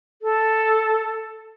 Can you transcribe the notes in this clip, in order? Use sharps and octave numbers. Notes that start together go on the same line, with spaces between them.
A4